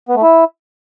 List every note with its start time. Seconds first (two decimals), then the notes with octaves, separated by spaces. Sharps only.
0.09 B3
0.16 A3
0.23 E4